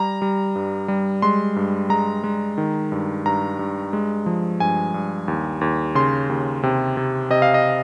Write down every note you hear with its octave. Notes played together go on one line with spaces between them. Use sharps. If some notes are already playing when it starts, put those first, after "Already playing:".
Already playing: G3 A#5
G3
G2
G3
G#3 C6
G2
G#3 A#5
G#3
D#3
G2
G2 A#5
G2
G#3
F3
G2 G#5
G2
D#2
D#2
C#3 C6
D#2
C3
C3
C3 D#5
F5
D#5